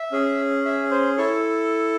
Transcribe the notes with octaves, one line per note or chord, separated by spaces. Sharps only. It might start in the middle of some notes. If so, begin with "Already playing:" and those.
Already playing: E5
C#4 G#4
E5
C5
E4 A4 C#5